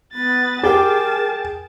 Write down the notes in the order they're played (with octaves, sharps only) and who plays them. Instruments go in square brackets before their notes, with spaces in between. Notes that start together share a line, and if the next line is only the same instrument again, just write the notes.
[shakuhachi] B3 [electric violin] B4 A6
[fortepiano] G4 [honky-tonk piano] G#4 G5 [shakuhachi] A#4 [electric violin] A5